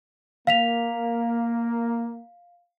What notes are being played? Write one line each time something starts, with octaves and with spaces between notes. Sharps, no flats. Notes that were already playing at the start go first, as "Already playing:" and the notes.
A#3 F5 B6 F7